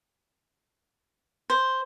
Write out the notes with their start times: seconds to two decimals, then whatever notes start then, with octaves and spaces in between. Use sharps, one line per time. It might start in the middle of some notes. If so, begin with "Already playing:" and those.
1.50 C5